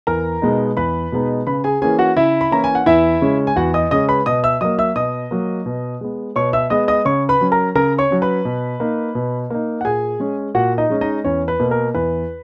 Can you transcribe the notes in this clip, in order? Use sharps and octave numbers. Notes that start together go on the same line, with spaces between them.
E2 A#4 A#5
B2 G#3 B3 D#4
E2 B4 B5
B2 G#3 B3 D#4
C#3 B4 B5
G#4 G#5
E3 A#3 C#4 G#4 G#5
F#4 F#5
C#3 E4 E5
B5
E3 A#3 C#4 A#5
G#5
F#5
E2 E4 E5
C#3 G#3 C#4
G#5
E2 F#4 F#5
D#5 D#6
C#3 G#3 C#4 D#5 D#6
B4 B5
B2 D#5 D#6
E5 E6
F#3 A#3 D#5 D#6
E5 E6
B2 D#5 D#6
F#3 A#3
B2
G#3 B3
B2 C#5 C#6
E5 E6
G#3 B3 D#5 D#6
D#5 D#6
C#3 C#5 C#6
B4 B5
F#3 C#4
A#4 A#5
C#3 A#4 A#5
C#5 C#6
F#3 C#4
B4 B5
B2
A#3 D#4
B2
A#3 D#4
F#5
A#2 G#4 G#5
G#3 C#4
A#2 F#4 F#5
D#4 D#5
G#3 C#4
D#4 D#5
E2 C#4 C#5
B4
B2 A#3
A#4
E2 B4